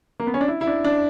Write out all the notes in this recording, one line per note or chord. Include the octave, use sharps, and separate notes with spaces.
A#3
B3
C#4
D4
E4
E4
D4
D4